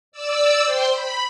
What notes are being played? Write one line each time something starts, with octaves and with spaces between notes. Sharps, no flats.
D5 E6
C5 G5 C6
B5